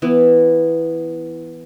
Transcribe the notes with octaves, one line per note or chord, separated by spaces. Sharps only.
E3 B3 E4